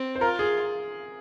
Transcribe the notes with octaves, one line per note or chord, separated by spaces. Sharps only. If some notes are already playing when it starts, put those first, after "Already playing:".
Already playing: C4
C5
F4 A#4
G#4